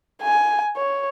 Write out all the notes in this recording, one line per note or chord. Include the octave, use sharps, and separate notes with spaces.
G#5
C#5